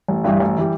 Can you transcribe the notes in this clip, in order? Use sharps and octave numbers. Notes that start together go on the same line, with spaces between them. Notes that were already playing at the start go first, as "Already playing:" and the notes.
A1
G2 E3 G3
A1
E3 G3